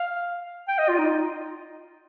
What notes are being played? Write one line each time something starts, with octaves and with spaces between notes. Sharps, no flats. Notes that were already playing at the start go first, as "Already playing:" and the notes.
Already playing: F5
G5
D#5
F4
D#4